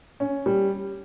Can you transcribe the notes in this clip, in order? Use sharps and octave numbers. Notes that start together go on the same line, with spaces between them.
C#4
G3